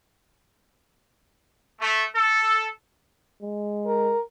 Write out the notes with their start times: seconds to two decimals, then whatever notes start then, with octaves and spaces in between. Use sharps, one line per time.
1.80 A3
2.15 A4
3.41 G#3
3.87 A#4